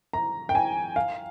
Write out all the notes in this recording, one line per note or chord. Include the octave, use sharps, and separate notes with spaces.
A#5
G5
G#5
F5